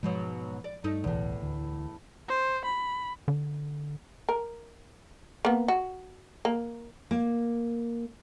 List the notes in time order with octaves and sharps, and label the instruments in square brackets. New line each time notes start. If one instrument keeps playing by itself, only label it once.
[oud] G#2 B2 F#3 [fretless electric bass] F3 G#3
[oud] D5
[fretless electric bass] G2 [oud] A3 D#4
[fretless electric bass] D1 B1 E3 [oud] E2 A2
[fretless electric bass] D2
[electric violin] C5
B5
[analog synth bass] D3
[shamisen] A#4
A#3 B3
F#4
A#3
[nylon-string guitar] A#3